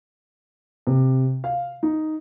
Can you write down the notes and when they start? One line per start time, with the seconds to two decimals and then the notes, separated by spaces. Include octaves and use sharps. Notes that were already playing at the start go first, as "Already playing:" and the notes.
0.87 C3
1.44 F5
1.83 D#4